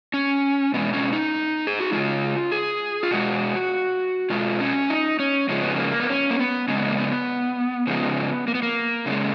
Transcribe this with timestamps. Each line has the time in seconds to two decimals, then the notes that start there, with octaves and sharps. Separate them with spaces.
0.14 C#4
0.74 B2 G#3 B3
0.93 C#4
1.13 D#4
1.67 G#4
1.80 F#4
1.92 C#3 G#3 F4
2.52 G#4
3.03 F4
3.11 B2 G#3 F#4
4.30 B2 G#3 F4
4.61 C#4
4.90 D#4
5.19 C#4
5.49 C#3 F3 G#3 A#3
5.63 B3
5.76 A#3
6.00 B3
6.09 C#4
6.30 A#3
6.39 B3
6.68 C#3 G#3 C#4
6.78 B3
6.88 A#3
6.97 B3
7.87 C#3 F3 G#3 B3
8.48 A#3
8.55 B3
8.63 A#3
9.06 C#3 F3
9.11 G#3